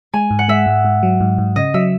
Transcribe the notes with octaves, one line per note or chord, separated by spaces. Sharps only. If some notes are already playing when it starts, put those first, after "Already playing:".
G#3 G#5
G#2
F#5
G#3 E5
G#2
G#2
F#3
G#2
G#2
C#3 D#5
F#3 E5